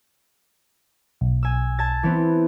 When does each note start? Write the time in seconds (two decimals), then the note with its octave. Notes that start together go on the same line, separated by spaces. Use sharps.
1.21 B1
1.43 G#5 E6
1.79 A5 G#6 A6
2.03 E3 B3 C4